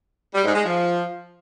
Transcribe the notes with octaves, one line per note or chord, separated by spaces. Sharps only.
G3
G#2
G#3
F3